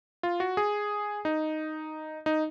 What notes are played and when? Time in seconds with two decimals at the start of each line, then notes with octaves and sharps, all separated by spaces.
0.23 F4
0.40 F#4
0.57 G#4
1.25 D#4
2.26 D#4